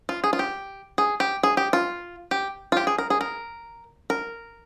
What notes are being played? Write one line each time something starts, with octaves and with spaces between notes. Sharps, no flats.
F4
G#4
F4
G4
G#4
G4
G#4
G4
F4
G4
F4
G4
G#4
A#4
G#4
A#4
A#4